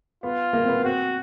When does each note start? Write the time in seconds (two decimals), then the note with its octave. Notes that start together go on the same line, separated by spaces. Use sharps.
0.23 B3 F4
0.53 A#3
0.63 C4
0.69 B3
0.84 C4 F#4